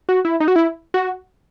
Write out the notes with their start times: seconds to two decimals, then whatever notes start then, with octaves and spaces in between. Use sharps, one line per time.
0.09 F#4
0.25 E4
0.40 D#4
0.48 F#4
0.56 E4
0.94 F#4